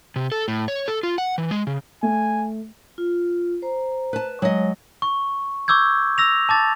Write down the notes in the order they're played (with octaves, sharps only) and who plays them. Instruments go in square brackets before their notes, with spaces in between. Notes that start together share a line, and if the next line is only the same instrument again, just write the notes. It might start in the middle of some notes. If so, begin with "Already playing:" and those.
[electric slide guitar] C3
A4
A2
C#5
A4
F4
F#5
E3
G#3
C#3
[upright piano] A3 [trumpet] G#5
[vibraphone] F4
C5 A#5
[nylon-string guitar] B4 A5
[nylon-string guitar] F#3 D#5 [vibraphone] G#3
[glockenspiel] C#6
C#6 D6 E6 G6 G#6
E6 A#6 F7
A5 D6 A6